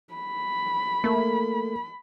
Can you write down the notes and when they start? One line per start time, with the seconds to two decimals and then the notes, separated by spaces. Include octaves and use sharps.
0.14 B5
1.04 A3 A#3